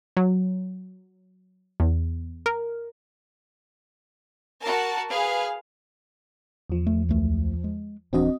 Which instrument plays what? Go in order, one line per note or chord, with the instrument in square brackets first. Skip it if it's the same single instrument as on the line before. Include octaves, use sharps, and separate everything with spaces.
[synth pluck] F#3
E2
A#4
[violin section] F#4 A#4 A5
G#4 B4 F5
[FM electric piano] E2 F3
[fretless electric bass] A3
C#2 E3 A3
G#3
[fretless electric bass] D1 E3 D4 [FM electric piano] C4 F#4 D#5